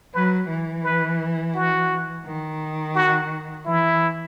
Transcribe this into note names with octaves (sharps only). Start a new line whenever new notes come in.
F#3 B4
E3
B4
F#4
D#3
F#4
E3 E4